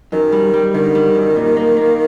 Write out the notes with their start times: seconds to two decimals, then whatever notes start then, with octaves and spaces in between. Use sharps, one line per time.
0.12 F#2 D#3
0.32 G3
0.54 G3
0.74 D3 D#3
0.95 G3
1.15 F#2
1.36 A#2
1.57 A#3
1.77 A#3